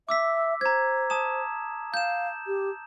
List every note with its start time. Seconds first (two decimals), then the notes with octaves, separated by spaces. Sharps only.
0.09 E5 D6 E6 B6
0.61 C5 A#5 G#6
1.10 A5 D#6 E7
1.94 F5 G6 E7
2.47 G4